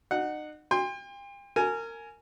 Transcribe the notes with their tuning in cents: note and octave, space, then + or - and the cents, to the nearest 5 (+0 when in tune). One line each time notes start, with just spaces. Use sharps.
D#4 -35 F#5 +0
G5 +40 C6 +0
A#4 -25 G#5 +10